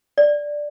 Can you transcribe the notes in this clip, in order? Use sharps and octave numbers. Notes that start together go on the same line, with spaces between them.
D5